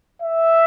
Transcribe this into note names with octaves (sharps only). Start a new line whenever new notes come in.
E5